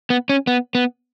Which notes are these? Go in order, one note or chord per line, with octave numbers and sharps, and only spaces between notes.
B3
C#4
B3
B3